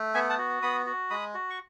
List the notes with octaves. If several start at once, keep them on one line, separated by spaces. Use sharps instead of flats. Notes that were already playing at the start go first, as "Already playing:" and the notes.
Already playing: A3
B3 E5 G#5
F#5 A5
F#4
B3 B5 D#6
F#4
G#3 B5 D#6
F#4
C#6